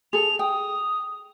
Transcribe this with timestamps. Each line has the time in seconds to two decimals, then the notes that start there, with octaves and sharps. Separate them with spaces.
0.13 G#4 A4 F7
0.39 G5 D#6